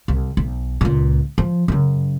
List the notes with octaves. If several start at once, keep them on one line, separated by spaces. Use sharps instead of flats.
C2
B1
C#2 A#2
F3
F#2 C#3